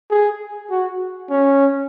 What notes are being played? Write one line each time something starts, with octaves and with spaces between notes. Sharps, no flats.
G#4
F#4
C#4